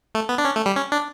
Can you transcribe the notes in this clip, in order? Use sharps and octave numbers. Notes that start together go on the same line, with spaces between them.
A3
B3
D4
C#4
A3
G3
C#4
D4